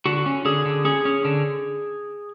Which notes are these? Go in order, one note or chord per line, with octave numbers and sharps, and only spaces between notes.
D3 F#4
C#4
D3 G#4
D3
C#4 G#4
C#4
D3